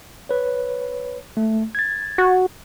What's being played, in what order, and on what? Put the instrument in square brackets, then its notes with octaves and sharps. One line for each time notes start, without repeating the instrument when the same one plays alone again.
[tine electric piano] B4 C#5
A3
G#6 A6
[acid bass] F#4